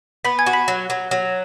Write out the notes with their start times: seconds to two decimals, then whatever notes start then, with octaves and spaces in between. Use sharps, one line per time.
0.24 B3 B5 B6
0.39 G#5 G#6
0.46 F#4
0.53 B5 B6
0.68 F#3
0.90 F#3
1.11 F#3